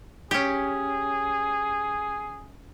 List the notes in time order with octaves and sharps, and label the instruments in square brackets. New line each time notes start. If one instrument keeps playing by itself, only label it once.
[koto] C#4 G4 [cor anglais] G#4